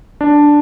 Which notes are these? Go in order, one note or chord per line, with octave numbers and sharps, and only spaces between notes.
D4